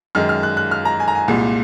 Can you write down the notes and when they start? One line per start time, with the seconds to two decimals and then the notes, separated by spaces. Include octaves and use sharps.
0.15 F#2 D#3 G#3 F6
0.29 F6
0.43 F#6
0.57 F#6
0.71 F6
0.85 A#5
1.00 G#5
1.08 A#5
1.15 G#5
1.28 C2 A#2 G#3